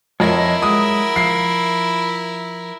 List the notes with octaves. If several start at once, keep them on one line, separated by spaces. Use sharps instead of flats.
F2 E4 A#4 C#5 D#5
F#3 G#3 D#6
F3 E5 C7